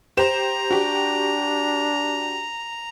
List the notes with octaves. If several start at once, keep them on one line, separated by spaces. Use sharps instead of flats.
G4 C5 A#5 E7
D4 F#4 G4